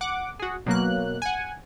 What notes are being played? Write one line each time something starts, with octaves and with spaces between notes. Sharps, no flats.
F#5 D6
F#4 G#4
B2 F#3 A#3 F#6
F#5 G#5